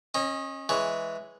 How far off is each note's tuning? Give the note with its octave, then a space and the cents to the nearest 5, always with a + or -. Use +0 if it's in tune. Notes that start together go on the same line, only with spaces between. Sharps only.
C#4 -30 D#5 +0
E3 +0 G#3 +0 C#5 +0